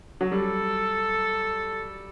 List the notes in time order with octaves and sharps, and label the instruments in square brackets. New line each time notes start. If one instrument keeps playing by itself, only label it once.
[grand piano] F#3
[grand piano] G3 [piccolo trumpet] A4